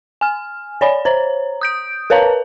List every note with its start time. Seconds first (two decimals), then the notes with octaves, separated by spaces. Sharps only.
0.21 G#5 F6
0.81 C#5 D5 G#5 B5
1.05 C5 C#5 A#5
1.61 D#6 G6 D7
2.10 A#4 B4 C#5 F5 A5 A#5